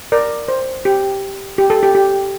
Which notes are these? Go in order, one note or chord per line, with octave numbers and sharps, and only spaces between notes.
A#4 D5
C5
G4
G4
A4
G4
G4